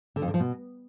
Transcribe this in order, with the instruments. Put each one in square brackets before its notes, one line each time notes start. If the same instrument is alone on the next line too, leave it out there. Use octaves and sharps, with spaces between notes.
[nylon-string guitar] D3
F2
D3
F3
B2